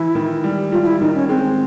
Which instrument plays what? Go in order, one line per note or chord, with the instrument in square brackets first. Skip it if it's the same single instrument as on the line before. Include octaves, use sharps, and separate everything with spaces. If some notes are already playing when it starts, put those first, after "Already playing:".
Already playing: [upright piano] E3 [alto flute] E4
[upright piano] D#3
G3
[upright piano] G3 [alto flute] F4
[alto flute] F4
E4
[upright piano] D#3 [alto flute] D#4
[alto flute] C#4
[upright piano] G#3 [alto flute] C4